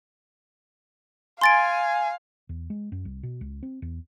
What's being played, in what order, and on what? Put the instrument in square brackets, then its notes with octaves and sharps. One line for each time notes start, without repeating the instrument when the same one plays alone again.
[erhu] F5 [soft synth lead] G#5 [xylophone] C6 A6 D7
[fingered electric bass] E2
G#3
F#2
C2
B2
C#2
C4
E2